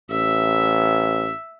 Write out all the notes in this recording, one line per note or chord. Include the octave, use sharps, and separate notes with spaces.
A1 E5